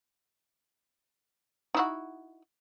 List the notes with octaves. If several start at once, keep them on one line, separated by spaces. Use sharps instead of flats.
D#4 E4 F#4